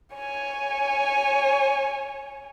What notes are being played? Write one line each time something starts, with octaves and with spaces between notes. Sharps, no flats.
C#5 G#5